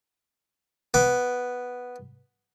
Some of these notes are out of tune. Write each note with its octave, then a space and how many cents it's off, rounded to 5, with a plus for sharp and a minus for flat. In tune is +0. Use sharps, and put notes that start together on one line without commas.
B3 +0 D6 +0